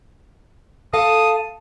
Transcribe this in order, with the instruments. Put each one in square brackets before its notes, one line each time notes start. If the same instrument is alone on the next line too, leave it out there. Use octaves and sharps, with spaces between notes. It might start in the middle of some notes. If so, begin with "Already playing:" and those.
[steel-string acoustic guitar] A4 F5 A5 [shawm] D#6